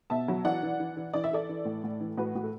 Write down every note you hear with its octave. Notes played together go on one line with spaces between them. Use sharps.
B2 E5 A5
F#3
E3 D5 F#5
E3
E3
E3
E3 D5
E5
E3 A4 D5
E3
A2
A2
E3
A2 F#4 B4
A2 F#4
A4